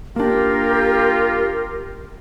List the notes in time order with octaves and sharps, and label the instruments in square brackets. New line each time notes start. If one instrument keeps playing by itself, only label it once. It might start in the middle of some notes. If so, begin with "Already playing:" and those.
[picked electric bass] A#3 D4 [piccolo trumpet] F4 [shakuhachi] G4 [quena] A#4